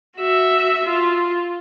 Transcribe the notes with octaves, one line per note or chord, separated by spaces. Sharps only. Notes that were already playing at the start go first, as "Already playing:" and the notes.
F#4 E5
F4